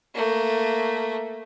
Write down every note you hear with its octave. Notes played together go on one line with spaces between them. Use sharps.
A3 A#3